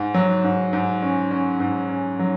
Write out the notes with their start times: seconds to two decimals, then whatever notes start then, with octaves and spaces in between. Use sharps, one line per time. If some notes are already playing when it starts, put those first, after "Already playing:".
Already playing: G#2
0.14 F#3
0.44 G#2
0.73 G#2
1.02 C#4
1.31 C#4
1.60 G#2
1.89 C#4
2.19 F#3